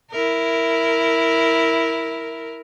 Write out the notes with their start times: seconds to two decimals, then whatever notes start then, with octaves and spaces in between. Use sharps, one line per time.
0.12 E4 A#4